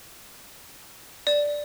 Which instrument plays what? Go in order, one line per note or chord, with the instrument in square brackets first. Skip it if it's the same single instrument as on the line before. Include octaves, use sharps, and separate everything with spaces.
[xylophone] D5